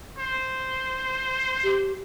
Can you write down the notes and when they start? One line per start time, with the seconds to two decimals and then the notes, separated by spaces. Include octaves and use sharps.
0.19 C5
1.64 G4